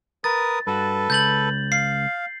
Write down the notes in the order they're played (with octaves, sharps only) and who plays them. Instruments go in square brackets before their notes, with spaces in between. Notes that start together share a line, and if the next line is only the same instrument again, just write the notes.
[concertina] A#4 B4 D#6 [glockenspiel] A6
[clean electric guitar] G2 F#4 [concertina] A4 B4
[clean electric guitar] C#2 B5 [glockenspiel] G6 A6 F#7
[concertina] F5 [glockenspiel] C7